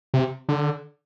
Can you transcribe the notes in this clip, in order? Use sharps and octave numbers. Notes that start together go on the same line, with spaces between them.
C3
D3